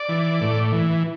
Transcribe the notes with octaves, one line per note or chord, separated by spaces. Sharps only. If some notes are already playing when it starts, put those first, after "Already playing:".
Already playing: D5
E3
A2
E3